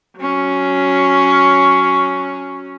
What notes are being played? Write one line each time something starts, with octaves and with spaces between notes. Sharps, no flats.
F#3 C#4